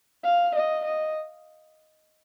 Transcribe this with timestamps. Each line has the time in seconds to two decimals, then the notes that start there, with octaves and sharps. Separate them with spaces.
0.24 F5
0.55 D#5
0.85 D#5